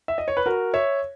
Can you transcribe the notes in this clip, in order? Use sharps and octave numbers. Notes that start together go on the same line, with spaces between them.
E5
D#5
C#5
B4
F#4 A#4
C#5 E5